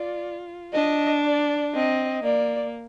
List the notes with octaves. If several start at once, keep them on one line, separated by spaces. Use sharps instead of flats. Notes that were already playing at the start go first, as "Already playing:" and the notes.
Already playing: F4 D5
D4 D#5
D5
C4 D#5
A#3 D5